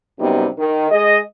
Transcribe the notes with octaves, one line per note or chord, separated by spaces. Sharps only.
F#2 C3 G3 B3 D#4
D#3
G#3 G#4 D#5